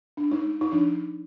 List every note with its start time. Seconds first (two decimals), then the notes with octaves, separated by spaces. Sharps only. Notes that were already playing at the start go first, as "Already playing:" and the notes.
0.17 D4
0.31 G#3 D#4
0.61 D#4
0.72 F3 D4